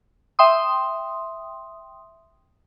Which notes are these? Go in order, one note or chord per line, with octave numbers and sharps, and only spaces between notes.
E5 G5 C6 D#6